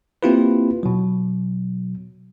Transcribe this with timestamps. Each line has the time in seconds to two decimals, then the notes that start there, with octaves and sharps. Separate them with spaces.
0.23 A#3 C4 E4 F4 G4 B4
0.83 B2 F#3